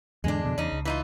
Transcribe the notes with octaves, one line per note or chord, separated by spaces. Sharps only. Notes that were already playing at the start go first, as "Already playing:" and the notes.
E2 G#2 D3 G#3 D4
F2 B2 D3
E2 C#3 D#4
C#2
E3 D#4 F4